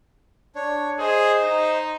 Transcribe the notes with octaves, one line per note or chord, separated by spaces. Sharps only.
D4 C#5
G#4 C5 D#5
D#4